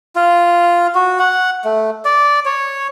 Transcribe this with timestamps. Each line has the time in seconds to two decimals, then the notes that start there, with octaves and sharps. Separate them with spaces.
0.16 F4
0.95 F#4
1.19 F#5
1.65 A3
2.05 D5
2.45 C#5